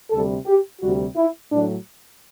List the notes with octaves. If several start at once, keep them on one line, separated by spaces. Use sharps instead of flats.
D2 C3 G3 A4
G4
D2 C3 G3 F#4
E4
A2 F#3 A3 D4